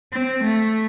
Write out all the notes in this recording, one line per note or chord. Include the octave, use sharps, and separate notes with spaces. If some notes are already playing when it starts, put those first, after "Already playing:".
C4
A3